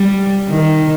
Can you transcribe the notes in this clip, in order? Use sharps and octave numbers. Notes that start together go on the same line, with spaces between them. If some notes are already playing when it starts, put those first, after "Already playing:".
Already playing: G3
D#3